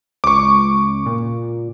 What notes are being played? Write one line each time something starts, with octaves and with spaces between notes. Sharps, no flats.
C#2 C#6 D6
A#2